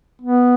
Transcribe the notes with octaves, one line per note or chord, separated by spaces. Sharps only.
B3